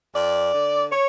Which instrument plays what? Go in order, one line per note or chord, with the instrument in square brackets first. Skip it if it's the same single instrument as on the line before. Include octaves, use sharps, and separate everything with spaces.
[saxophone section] F2 D5
D3
C#5